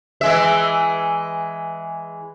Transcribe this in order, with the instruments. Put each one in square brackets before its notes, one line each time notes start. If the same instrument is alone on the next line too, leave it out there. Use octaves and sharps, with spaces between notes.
[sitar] E3 G#3 E5